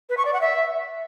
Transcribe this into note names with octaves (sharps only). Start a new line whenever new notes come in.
B4
C#6
D5
F#5
E5